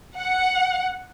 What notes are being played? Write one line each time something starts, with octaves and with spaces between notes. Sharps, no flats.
F#5